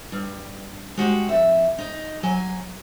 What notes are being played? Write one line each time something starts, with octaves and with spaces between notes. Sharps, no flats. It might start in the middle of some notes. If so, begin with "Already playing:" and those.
G2
G#3 F#4 G4
F2 E5
D#4
F#3 G#5